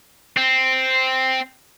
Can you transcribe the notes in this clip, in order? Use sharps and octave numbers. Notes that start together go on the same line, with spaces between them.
C4